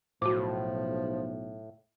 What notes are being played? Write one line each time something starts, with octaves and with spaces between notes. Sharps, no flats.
B1 A2 F3 F#4 D6